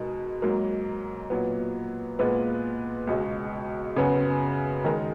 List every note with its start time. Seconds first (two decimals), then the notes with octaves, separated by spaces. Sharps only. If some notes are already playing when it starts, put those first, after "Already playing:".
Already playing: B2 G#3 D#4 A#4
0.42 G#2 F#3 A#3
1.30 A#2 F#3 B3
2.19 A#2 G#3 B3 F4 B4
3.07 C#2 B2 G#3
3.96 F#2 C#3 F#3 B3
4.84 D#3 G#3 D#4 A#4